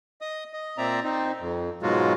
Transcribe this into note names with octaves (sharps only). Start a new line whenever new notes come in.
D#5 D#6
D#5
A#2 C4 D5 E5 A#5
C4 D#4
F2
G#2 B2 F#3 G#3 F4 F#4